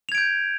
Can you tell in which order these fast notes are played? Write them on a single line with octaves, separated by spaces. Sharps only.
F7 G#6 D7 G6